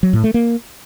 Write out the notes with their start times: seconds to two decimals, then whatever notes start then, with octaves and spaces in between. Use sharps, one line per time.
0.03 F#3
0.13 A2
0.24 A3
0.34 A#3